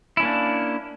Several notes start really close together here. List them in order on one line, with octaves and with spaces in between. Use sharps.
E4 C#4 A#3 D4